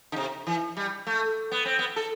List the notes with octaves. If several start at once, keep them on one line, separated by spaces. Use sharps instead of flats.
D3
C3
E3
G3
A3
B3
C4
B3
A4